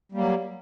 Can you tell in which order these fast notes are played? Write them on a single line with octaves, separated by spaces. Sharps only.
G3 A#3 F#3